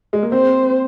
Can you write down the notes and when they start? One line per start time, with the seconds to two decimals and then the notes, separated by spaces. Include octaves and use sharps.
0.13 G#3
0.22 A#3
0.32 C4 C5